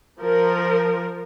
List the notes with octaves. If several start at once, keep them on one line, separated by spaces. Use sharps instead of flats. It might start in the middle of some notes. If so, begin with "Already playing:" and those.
F3 A#4